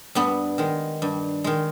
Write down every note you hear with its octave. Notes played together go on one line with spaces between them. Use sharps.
G2 B3
D#3 G#3
G2
D#3 G#3